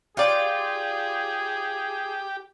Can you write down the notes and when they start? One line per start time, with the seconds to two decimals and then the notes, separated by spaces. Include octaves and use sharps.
0.17 F4 G4 G#4 D5